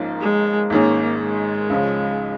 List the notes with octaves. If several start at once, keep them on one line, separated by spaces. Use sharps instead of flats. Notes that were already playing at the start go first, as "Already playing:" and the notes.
Already playing: G#1 G#2 F3 A#3 C#4
G#3
G#1 G#2 D#3 A#3 C#4 G#4
G#3
C#2 C#3 F3 C#4